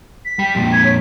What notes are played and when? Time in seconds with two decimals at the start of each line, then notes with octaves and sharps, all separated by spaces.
0.25 B6
0.39 G3 G5
0.55 F2 A#2
0.72 G#6
0.84 C#5